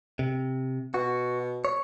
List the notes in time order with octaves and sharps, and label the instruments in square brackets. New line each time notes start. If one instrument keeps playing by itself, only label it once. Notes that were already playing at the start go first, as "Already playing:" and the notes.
[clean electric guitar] C3
[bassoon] B2 [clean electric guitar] F#4
[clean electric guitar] C#5